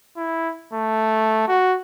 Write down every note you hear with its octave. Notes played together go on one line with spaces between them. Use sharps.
E4
A3
F#4